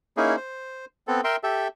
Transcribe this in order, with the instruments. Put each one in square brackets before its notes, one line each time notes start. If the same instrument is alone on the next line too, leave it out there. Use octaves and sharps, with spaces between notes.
[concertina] A#3 C#4 D#4 E4 G#4
C5
B3 C4 A4
A#4 E5 G5 C6
G4 A4 E5